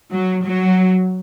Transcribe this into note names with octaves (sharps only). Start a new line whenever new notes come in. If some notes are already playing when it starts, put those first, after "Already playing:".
F#3
F#3